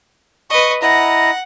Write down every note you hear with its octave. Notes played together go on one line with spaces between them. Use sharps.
B4 D#5 C#6
E4 D#5 F#5 A#5